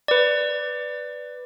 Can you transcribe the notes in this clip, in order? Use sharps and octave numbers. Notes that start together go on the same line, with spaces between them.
B4 D5